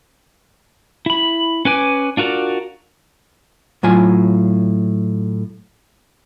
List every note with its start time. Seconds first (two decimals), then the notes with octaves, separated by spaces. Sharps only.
1.06 E4 B5
1.65 C#4 B4 G#5 D6
2.17 D4 F4 F#4 A#4 D5
3.83 A2 F#3 F4 G#5